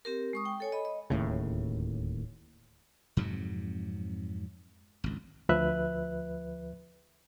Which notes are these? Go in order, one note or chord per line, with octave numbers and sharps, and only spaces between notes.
C4 G4 A#4
G#3 C#6 D#6
G5
A4 C#5 G#5
D#5 B5
D#5
D1 D#2 A2 C#3
F2 G#2 C3 F#3
G#1 C#2
D2 F3 B4 E5 F#6